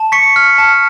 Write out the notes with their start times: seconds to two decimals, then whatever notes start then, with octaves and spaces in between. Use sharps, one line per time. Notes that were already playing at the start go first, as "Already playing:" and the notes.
Already playing: A5
0.12 C#6 B6 C#7
0.36 F6
0.58 A5